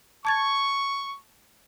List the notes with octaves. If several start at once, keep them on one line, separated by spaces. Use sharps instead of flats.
A5 C#6 G#6 A6